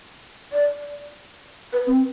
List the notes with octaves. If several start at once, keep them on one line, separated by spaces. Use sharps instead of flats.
D5
B4
C4